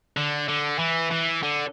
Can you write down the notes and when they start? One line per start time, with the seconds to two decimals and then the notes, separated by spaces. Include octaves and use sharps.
0.17 D3
0.48 D3
0.79 E3
1.11 E3
1.43 D3